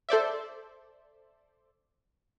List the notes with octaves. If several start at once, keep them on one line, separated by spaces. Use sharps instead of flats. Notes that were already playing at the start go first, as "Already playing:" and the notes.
A4 C5 D5 E5